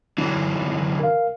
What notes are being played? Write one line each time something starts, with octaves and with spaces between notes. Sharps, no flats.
D3 E3 F#3 D4 E4
A#4 F5